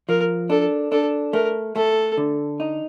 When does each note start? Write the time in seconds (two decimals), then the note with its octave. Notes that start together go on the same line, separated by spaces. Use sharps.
0.09 F3 A#4
0.50 D4 A4
0.92 D4 A4
1.33 A3 A#4
1.76 A3 A4
2.17 D3
2.60 D#4